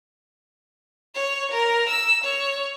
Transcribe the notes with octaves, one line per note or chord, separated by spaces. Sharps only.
C#5
A#4
E6
C#5